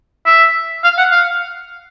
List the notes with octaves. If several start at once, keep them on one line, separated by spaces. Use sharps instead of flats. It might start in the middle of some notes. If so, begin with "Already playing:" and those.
E5
F5
F#5
F5